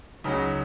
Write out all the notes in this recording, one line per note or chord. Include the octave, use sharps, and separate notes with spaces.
C#2 C#3 F#3 D#4